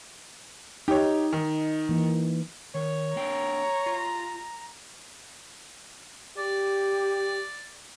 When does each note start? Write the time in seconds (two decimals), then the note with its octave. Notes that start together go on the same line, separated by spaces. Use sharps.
0.88 D#4 G4 C#5
1.33 D#3
1.89 E3 A#3
2.74 D#3 C#5
3.16 A#3 D4 G5 A#5
3.86 F4
6.38 G4 D5